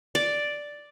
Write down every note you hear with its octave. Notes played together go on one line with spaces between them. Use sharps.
D5